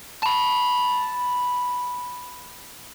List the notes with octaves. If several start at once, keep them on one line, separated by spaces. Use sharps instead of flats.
A5 B5